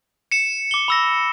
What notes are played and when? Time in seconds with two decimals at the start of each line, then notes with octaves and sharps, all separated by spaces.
0.32 C#7 E7
0.71 D6 G7
0.88 B5 E6 A#6